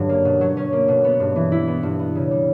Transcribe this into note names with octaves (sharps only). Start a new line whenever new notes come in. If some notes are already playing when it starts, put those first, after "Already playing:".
Already playing: G2 D3 F#3 C#4
A#3
B2
F#3
C#4
A#3
B2
B3
G2
E3
E4
B3
G2
B3
C#3
G3